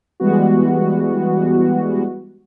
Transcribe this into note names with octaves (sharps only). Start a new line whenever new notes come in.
E3 G3 G#3 B3 F#4